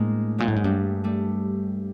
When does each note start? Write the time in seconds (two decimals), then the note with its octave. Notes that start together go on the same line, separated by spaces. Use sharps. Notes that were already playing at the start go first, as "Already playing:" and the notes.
Already playing: A2 G#3 A#3 C4 D4
0.38 A#2 F#3 G#3
0.48 A2
0.56 G#2
0.64 G2 G3 A3
1.04 G3 A3